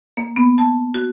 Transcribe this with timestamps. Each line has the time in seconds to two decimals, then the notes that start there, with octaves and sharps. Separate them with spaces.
0.17 A#3
0.36 B3
0.58 A5
0.94 F#4